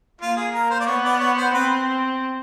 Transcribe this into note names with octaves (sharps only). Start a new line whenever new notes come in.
A#3 F4
G#4
A#4
C5
D5
B3 C#5
D5
C#5
C5
C4 B4